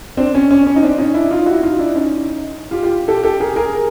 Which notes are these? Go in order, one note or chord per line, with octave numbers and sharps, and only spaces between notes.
C4 D4
C#4
C#4
C#4
D#4
C4 D4
C#4 D#4
D4 E4
D#4 F4
E4 F#4
D#4 F4
D4 E4
C#4 D#4
F4 G4
F4 G4
G4 A4
G4 A4
G#4 A#4
G#4 A#4